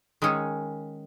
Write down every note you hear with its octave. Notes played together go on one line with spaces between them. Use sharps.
D#3 G#3 C#4 G#4